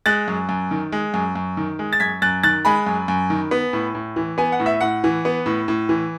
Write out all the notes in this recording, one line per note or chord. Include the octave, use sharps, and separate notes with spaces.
G#3 F#6 A6
F#2
F#2
D#3
G#3
F#2
F#2
D#3
G#3
A6
F#2 G#6 B6
F#2 F#6 A6
D#3 F#6 A6
G#3 G#5 B5
F#2
F#2
D#3
B3
A2
A2
E3
B3 G#5
F#5
A2
E5
A2 F#5
E3
B3
A2
A2
E3